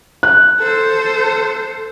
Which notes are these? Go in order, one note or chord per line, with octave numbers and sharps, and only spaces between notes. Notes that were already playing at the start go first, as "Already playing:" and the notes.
F#6
A4 C5